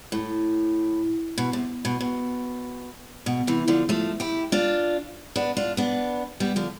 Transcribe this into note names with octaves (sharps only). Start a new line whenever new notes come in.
A2
B2
C3
B2
B2
B2
C3 E3
D3 F3
F3 A3
E4 G4
D4 F4
B3 D4
D4 F4
B3 D4
G3 B3
D3 F3